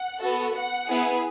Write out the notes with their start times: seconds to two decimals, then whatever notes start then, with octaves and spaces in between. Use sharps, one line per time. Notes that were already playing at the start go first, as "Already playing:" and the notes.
Already playing: F#5
0.21 B3 F#4 A4
0.55 F#5
0.88 B3 E4 G#4